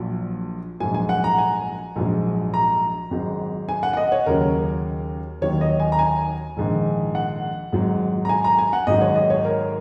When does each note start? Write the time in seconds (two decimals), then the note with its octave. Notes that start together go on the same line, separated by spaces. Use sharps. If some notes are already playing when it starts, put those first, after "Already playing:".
Already playing: A#1 A#2 F#3
0.80 A#1 G#2 F#3 G#5
0.94 G#5
1.09 F#5
1.24 A#5
1.38 G#5
1.96 A#1 G#2 F#3
2.54 A#5
3.11 G#1 G#2 F#3
3.69 G#5
3.83 F#5
3.93 F#5
3.97 D#5
4.12 C#5
4.26 D#2 C#3 F#3 A#4
5.42 D#2 D#3 F#3 C#5
5.61 D#5
5.80 G#5
5.92 A#5
5.99 G#5
6.57 A#1 G#2 D#3
7.15 F#5
7.72 G#1 G#2 F#3
8.25 A#5
8.29 G#5
8.44 A#5
8.58 G#5
8.73 F#5
8.87 G#1 G#2 D#3 F#3 D#5
9.01 C#5
9.16 D#5
9.30 C#5
9.45 A#4